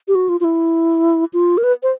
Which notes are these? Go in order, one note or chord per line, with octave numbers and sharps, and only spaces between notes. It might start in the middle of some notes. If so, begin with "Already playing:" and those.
G4
F#4
F4
F4
E4
F4
A#4
B4
C5